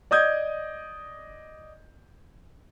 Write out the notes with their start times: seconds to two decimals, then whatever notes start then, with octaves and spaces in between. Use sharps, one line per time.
0.11 D5 D#5 D#6 G6 G#6